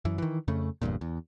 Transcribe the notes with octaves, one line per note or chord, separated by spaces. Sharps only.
F#2 E3
D#3 E3
F2 C#3 A3
G1 E2 G2 A#2
E2